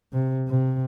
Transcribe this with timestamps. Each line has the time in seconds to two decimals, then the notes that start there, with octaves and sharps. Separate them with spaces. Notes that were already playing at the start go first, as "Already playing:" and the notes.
0.13 C3
0.48 C3